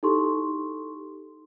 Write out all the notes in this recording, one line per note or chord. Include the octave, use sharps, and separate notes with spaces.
D#4 E4 G4 A4 C6 C#6